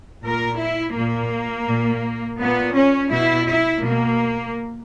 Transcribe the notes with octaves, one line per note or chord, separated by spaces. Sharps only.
A#2 A#4
E4
A#2 A#3
A#2
A#2 B3
C#4
B2 E4
E4
B2 A#3